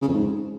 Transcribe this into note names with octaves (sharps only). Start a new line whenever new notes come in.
C#3
F2
G#2